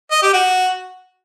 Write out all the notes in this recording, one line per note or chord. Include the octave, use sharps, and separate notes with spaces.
D#5
G4
F#4